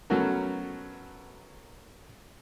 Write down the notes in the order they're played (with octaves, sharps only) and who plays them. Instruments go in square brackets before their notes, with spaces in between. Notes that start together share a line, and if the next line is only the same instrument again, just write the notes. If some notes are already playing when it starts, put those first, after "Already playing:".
[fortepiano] F#3 A3 B3 C#4 F#4 A#4